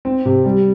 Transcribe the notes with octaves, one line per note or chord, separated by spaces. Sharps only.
C4
C3
G3